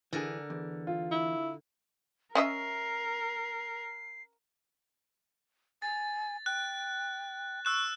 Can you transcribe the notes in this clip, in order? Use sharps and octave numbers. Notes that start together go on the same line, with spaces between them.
D3 E3 G#4 A#4
E2
F4
E4
C#4 A#4 D#5 E5 C7
G#5 A6
G5 F#6
C#6 E6 F#6 E7